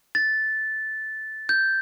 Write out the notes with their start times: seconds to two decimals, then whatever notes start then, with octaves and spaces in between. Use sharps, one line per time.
0.15 A6
1.49 G6